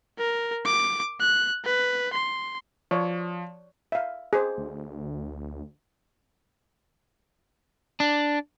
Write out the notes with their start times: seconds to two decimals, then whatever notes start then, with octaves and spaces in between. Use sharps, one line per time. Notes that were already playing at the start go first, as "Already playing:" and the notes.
0.18 A#4
0.65 D6
1.20 F#6
1.65 B4
2.13 C6
2.91 F3 C#5 D5
3.92 E5 F5
4.33 G#4 C5
4.58 D2
8.00 D4